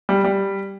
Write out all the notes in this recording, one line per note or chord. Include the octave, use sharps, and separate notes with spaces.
G3
G3